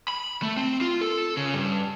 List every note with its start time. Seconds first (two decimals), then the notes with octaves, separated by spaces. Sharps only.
0.08 B5
0.42 A3
0.57 C4
0.81 F4
1.01 A4
1.37 C#3
1.54 G2